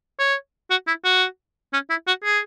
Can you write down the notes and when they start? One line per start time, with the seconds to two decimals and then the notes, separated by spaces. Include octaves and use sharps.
0.19 C#5
0.70 F#4
0.87 E4
1.05 F#4
1.73 C#4
1.90 E4
2.07 F#4
2.24 G#4